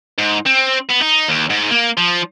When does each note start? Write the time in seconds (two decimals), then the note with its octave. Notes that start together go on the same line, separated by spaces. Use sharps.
0.18 G#2
0.46 C4
0.89 B3
1.01 D#4
1.28 D#2
1.51 G#2
1.71 A#3
1.98 F3